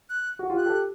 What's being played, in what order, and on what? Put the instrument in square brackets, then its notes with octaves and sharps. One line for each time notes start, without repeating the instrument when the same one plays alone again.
[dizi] F#6
[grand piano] F#4
F4 G4
[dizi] F#6
[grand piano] G4 A4